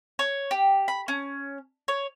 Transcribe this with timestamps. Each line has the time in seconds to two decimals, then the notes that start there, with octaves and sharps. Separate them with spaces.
0.19 C#5
0.51 G4
0.88 B5
1.08 C#4
1.88 C#5